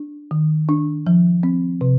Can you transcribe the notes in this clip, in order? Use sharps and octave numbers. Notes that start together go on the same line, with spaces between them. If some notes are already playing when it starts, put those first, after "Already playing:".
Already playing: D4
D#3
D4
F3
C4
C3